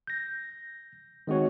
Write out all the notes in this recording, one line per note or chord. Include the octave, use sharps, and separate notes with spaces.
G6 A#6
D#3 G#3 C4 F#4 C#5